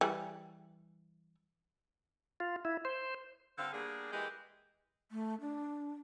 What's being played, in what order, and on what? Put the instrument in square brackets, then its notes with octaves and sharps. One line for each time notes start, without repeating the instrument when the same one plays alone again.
[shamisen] E3 G3
[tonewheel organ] F4
E4
C5
[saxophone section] G2 D3 C4 A4 C5 F5
G3 A#3 B3 D4 G#4
E3 G#3 A#3 G4 D#5
[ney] A3
D4